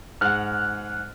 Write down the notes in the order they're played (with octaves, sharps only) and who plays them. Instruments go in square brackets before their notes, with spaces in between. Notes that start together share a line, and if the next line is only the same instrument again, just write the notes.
[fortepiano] G#2 F#5 [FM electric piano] F6 F#6